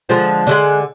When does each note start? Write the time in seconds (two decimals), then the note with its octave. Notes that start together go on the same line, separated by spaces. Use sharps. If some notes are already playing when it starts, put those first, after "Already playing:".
0.09 D3 F3 G#3
0.47 D3 F3 G#3